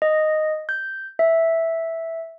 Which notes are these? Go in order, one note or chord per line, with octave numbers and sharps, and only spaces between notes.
D#5
G6
E5